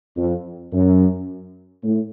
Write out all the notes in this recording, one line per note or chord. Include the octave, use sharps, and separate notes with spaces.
F2
F#2
A2